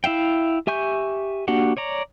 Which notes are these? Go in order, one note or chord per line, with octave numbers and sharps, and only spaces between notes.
E4 E5 F5 G5
G4 E5 G#5 C#6 G6
A#3 D4 F#4 G4 F#5
C#5 D5 A#5